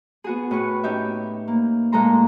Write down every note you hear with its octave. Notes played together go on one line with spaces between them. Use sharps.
B3 F#4 G#4
A2 B4 C#6
C#4 D#4 G4 E5
A#3
A#2 G#3 A3 A4 A#5 C6